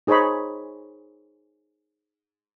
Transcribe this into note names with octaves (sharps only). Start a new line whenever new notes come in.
D#4 G#4 C5 C#5 D#5 B5